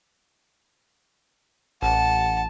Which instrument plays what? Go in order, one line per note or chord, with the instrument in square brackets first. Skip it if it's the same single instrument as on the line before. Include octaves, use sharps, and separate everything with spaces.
[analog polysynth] A1 [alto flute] F#5 [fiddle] A5